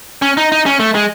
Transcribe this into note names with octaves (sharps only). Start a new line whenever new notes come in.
C#4
D#4
D#4
C#4
A3
G#3